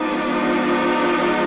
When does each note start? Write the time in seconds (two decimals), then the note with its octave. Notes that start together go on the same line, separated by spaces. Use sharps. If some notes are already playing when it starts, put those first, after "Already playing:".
Already playing: F3 G#3 B3 D4 D#4
0.29 D#4